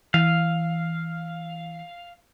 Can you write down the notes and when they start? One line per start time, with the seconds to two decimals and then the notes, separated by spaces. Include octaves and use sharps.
0.14 E3 F5